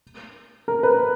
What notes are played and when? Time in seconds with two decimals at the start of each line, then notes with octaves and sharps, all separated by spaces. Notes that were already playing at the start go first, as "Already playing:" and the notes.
0.68 A#4
0.83 B4